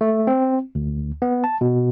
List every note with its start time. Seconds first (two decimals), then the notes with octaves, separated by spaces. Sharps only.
0.01 A3
0.27 C4
0.75 D2
1.22 B3
1.44 A5
1.61 B2